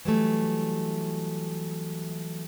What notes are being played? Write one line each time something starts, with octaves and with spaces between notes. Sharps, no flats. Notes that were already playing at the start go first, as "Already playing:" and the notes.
E3 F#3 G3 A3